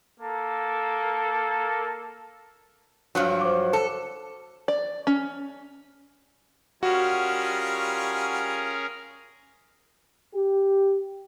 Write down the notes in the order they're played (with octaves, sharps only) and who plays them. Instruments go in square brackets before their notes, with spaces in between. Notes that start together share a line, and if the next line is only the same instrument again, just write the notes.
[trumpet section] A#3 A4
[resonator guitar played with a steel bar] G2 F3 F#3 [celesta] C#5
[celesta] C5 C#5 D6
[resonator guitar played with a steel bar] A4
[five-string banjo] D5
C#4
[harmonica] G3 F4 [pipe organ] C#4 G#4 A#4 [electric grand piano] F#4
[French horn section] G4